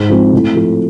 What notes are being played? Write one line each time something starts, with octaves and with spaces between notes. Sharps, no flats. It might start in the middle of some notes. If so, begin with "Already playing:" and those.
Already playing: G#2
F3 G#3 C4
A2
F3 A3